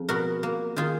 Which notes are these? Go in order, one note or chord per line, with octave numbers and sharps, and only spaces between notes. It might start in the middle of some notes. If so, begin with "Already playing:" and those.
Already playing: F2 G#4
B2 F#4 A#4
A#3
D#3 F4 G#4